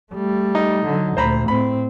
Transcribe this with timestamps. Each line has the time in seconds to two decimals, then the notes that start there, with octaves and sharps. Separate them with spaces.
0.12 G3 A3
0.55 D#4
0.86 D3 F#3
1.17 D2 A#2 C5 A#5 B5
1.48 A2 C4 B5